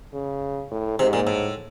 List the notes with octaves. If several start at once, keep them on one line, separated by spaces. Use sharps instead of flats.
C#3
A2
G#2 C3
A#2
A2